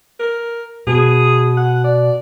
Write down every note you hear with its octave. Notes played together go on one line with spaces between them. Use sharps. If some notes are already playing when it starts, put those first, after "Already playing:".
A#4
B2 G#4
F#5
D5